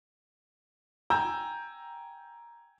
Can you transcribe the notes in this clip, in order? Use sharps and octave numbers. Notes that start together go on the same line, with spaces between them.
G5 G#5 A#5 E6 G6